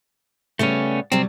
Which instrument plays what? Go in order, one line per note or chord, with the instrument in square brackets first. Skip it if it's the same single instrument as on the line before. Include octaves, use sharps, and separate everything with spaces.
[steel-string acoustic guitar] C#3 G3 B3 [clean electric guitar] A3 C#4
[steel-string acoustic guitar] C3 F#3 G3 [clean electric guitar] C4